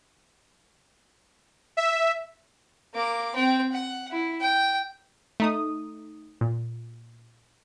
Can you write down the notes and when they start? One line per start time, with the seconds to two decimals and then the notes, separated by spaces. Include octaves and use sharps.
1.77 E5
2.94 A#3 D6
3.35 C4 G5
3.72 F#5
4.11 E4
4.40 G5
5.40 A3 D#4 D#6
6.41 A#2